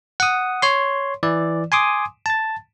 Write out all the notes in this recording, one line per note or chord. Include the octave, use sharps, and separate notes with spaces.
F#5 D#6
C#5 C6
E3 D5
G#5 C6 D6 D#6
A5 A6